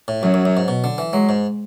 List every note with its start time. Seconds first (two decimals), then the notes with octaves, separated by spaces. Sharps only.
0.08 A2
0.22 F#2 F#3
0.34 F#2
0.45 F#2
0.57 G#2
0.68 B2
0.84 D3
0.98 E3
1.13 F#3 G#3
1.29 G#2